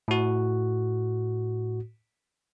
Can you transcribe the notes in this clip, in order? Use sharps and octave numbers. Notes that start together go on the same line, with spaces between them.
A2 F#4